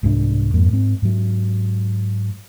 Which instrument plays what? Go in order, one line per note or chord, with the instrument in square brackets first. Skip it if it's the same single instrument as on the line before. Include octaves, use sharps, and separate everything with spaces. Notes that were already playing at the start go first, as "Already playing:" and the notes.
[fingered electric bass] C2 G#2 G#3 D4
F2 G#2 A#3
G#2 C4
G#2 F#3